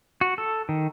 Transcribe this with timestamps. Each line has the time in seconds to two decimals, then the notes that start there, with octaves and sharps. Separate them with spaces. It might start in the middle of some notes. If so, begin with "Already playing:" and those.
0.21 F#4
0.38 A4
0.69 D#3